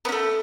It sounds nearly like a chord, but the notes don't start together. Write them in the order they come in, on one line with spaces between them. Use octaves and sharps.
B3 C#4 A3